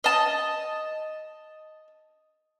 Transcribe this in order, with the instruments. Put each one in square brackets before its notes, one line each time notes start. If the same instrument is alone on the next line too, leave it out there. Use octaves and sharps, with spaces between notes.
[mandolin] D#5 A5